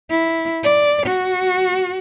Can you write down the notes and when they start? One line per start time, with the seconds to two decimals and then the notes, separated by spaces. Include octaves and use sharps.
0.10 E4
0.63 D5
1.06 F#4